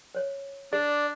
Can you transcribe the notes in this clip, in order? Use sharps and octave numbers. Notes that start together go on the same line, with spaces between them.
C5 C#5
D4 G#4 D5